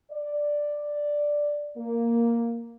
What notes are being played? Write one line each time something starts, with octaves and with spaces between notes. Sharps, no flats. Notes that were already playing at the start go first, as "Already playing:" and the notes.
D5
A#3